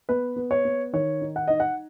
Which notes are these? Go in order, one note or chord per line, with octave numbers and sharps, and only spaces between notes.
B3 B4
B3
C#5
B3
D#3 C#5
D#4
F#5
D#4 D#5
F#5